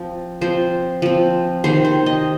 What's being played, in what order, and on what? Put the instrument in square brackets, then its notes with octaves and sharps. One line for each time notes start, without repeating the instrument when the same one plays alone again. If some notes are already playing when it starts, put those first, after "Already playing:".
Already playing: [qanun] F3 C4
F3 C4 C5
F3 C4
C3 D#3 C4 C5
C5
D#5